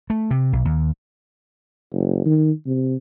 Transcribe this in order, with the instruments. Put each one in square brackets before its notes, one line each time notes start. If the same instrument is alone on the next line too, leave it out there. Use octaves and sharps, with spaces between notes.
[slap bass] A3
C3
B1
D#2
[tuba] F#1
D#3
C3